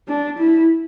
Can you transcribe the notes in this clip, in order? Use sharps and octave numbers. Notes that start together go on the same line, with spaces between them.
D4
E4